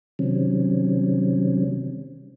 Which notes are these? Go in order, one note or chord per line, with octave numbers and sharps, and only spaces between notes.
C3 D#3 F#3 G3 C4 C#4